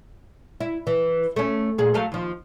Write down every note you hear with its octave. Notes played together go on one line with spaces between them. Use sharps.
E4
E3
A3 C#4
A#2 G#4
F#3 A3 F5
D#2 F3